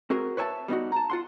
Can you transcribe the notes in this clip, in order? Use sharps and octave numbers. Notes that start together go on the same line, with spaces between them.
C4 F#4 G#4 A#4
B4 C#5 E5 G#5 A5
G3 B3 D#4 F#4
A5 A#5
F4 F#5 C6